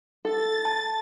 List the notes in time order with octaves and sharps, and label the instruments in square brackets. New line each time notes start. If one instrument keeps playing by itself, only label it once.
[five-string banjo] A4 [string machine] A6
[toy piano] A5